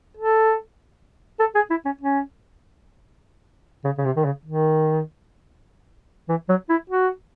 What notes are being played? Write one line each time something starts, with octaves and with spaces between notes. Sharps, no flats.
A4
A4
G#4
E4
C#4
C#4
C#3
C#3
C3
D#3
C#3
D#3
E3
F#3
E4
F#4